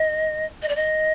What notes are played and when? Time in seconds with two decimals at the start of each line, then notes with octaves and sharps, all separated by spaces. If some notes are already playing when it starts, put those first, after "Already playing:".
Already playing: D#5
0.62 D#5
0.68 D5
0.76 D#5